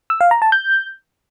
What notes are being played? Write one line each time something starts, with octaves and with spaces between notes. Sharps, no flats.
E6
F5
A#5
A5
G6